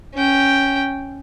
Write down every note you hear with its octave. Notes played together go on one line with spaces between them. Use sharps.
C#4 G5